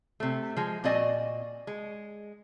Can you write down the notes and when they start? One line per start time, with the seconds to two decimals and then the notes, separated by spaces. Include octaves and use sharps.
0.20 C3 A3
0.56 F3 G#3
0.84 A#2 C4 F#4 D5 D#5 G#5
1.67 G#3